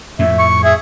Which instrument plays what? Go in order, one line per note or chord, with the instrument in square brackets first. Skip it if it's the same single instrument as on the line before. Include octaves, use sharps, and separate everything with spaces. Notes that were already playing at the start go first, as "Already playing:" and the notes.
[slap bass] F2 A2 [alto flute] E5
[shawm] C#6
[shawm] G#4 [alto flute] E5